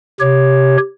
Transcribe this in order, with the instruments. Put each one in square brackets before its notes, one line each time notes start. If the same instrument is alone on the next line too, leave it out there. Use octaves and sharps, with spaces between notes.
[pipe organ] C3 G4 C#5